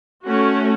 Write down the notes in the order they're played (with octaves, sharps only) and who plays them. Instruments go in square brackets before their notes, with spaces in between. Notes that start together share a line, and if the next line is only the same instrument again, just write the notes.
[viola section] A3 C#4 F#4